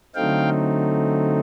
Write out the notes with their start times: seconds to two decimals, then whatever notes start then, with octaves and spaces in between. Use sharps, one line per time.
0.15 D3 F#3 A3 C4 D#4 F5 G5